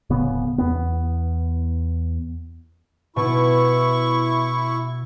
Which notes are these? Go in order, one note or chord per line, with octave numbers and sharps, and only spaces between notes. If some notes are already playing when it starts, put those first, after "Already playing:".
D1 C#3 B3
E2 B3
B2 E4 C#6